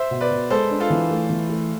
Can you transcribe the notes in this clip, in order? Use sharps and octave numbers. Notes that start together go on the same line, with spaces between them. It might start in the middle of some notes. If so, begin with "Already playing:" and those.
Already playing: C5 E5
B2
B4 D5
B2
G#3 A4 C5
D4
F4 A4
E3
A3
E3
A3